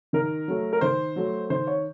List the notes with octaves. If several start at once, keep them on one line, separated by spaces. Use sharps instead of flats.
D#3 A#4
F#3 A3
A#4
D#3 C5
F#3 A3
D#3 C5
C#5